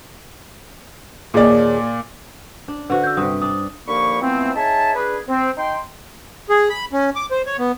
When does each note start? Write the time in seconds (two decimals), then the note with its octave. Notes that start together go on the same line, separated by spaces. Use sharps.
1.34 D#2 A#2 G#4 C#5 D5
2.68 D4
2.90 D3 F#4 B4 C5
3.03 E6 G6
3.17 G2 C3 D#6
3.42 D4 D#6
3.88 D#2 D3 F3 A#3 B5 C#6
4.22 E3 F3 A3 B3 C4
4.56 D#4 G#4 C#5 E5 A5
4.95 D4 G#4 B4
5.28 C4
5.58 D#4 G5 C6
6.49 G#4
6.70 B5
6.93 C#4
7.16 D6
7.31 C5
7.46 C#5
7.58 B3